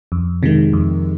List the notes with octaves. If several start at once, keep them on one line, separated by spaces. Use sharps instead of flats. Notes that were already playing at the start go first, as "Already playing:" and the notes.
F2
C3 D#3 G#3
F2